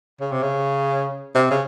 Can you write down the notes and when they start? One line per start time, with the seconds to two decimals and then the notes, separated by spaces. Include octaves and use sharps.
0.20 C#3
0.32 C3
0.43 C#3
1.35 C3
1.50 C#3